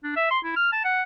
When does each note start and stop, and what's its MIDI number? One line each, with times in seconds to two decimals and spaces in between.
0.04 0.12 62
0.16 0.26 76
0.31 0.39 84
0.44 0.55 64
0.56 0.70 89
0.72 0.80 81
0.84 1.03 78